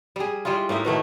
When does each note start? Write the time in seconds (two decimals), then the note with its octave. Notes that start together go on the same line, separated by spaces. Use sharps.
0.16 G3 G#4
0.45 G3 G#3 E4 F4
0.69 A2 A#3 D#4 E5
0.85 B2 D#3 A3 E4